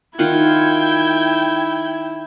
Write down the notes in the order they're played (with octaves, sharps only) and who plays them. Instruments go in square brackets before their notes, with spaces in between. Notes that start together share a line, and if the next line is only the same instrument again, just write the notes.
[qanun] D#3 F4 F#5 [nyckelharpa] E4 [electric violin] G5 G#6